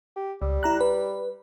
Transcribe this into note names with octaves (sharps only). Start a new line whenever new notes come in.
G4
C#2 G3
E4 A#5 F#6
B4